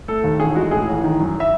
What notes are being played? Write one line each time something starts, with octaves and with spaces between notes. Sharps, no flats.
A3 A4
D#2
A1 G#4
G#3 F#4
A2 G#4
A1
D#3
F#2
E5